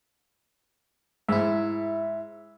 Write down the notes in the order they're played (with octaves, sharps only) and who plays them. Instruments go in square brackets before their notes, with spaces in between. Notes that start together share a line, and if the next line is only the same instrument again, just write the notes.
[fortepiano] G#2 [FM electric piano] E4 E5